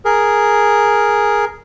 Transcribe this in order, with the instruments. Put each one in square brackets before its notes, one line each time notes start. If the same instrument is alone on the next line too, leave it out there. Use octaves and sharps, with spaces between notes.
[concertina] G#4 A#4